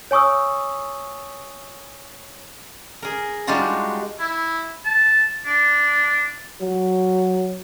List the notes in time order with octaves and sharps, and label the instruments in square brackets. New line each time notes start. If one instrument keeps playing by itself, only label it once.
[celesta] C#5 G#5 C#6 D#6 E6
[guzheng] G#4 A#4
G3 G#3 D4 D#4 F4 F#4
[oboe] E4
A5
D4
[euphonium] F#3